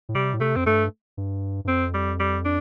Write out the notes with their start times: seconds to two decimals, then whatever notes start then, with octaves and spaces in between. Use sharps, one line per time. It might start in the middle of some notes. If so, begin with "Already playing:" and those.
0.09 A2
0.15 C3 G3
0.34 A2
0.40 C3 A3
0.56 F2 C4
0.66 G2 A3
1.17 G2
1.65 G2
1.68 F2 C4
1.94 G3
2.20 G3
2.45 D4